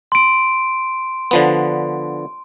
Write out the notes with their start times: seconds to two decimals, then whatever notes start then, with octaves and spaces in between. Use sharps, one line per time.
0.12 C6 D7
1.31 D3 F3 B3